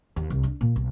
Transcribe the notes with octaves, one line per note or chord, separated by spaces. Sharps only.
D#2
C2
D4
A#2
B1